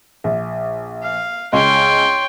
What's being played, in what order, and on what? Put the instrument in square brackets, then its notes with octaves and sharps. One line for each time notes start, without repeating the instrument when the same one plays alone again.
[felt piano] A#1
[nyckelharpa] F5
[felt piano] C#2 D#5 [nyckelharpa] C#5 G5 [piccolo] C6